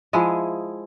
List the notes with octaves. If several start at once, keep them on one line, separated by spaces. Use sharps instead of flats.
F3 G#3 E4 G#4